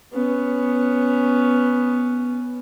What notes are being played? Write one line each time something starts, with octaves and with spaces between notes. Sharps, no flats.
B3 C#4